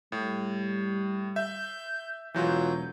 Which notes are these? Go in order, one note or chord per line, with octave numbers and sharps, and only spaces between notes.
A2 G3
E5 G6
E1 E3 F#3 F4 G6